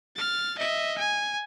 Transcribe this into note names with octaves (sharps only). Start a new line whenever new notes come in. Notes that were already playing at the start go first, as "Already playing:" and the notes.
F6 A6
D#5 E5
G#5